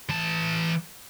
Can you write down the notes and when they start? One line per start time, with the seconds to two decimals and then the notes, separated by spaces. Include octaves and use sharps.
0.09 E3 A5